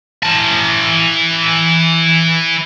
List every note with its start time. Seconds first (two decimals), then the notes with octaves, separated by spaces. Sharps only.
0.23 E3 A5